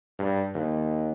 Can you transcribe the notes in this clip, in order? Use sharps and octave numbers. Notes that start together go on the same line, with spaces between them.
G2
D#2